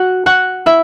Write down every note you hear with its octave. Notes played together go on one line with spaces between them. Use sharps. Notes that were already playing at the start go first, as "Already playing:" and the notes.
Already playing: F#4 F#5
F#4 F#5
E4 E5